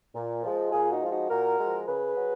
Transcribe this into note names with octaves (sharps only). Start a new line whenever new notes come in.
A#2
F3 G#3
A#2 F4 G#4
D#4 F#4
F3 G#3 F4
D#4 F#4
A#2 F#4 A#4
F3 G#3
C#3 G#4 B4
F#3